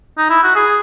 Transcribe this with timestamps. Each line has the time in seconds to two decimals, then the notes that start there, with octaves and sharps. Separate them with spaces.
0.18 D#4
0.30 E4
0.43 F#4
0.55 G#4